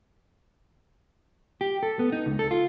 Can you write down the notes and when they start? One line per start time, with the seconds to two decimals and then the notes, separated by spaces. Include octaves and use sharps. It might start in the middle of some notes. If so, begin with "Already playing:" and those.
1.61 G4
1.83 A4
1.99 B3
2.12 D#4
2.26 C#2
2.39 A4
2.51 F4